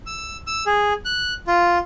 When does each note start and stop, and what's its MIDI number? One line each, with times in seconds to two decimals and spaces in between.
0.06 0.37 88
0.47 0.64 88
0.66 0.93 68
1.05 1.34 90
1.48 1.78 65